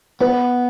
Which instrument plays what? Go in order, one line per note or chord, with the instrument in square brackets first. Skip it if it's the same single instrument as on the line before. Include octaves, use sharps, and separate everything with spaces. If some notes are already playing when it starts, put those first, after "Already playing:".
[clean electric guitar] B3 [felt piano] B4